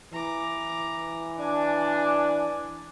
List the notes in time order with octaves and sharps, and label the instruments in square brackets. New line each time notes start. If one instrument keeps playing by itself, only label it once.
[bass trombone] E3 [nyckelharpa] A#5 D6
[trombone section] D4 [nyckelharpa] G#5 D6